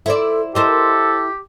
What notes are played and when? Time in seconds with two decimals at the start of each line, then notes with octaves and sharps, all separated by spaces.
0.06 E4 A4 C5 D5
0.55 E4 G4 A4 A#4 C5 D#5